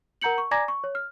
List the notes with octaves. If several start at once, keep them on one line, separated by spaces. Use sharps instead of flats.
A#4 F#5 A#5 G6 C#7 F#7
C#6
D5 G#5 A#5 D6 G#6 A#6
C#6
C#5
F6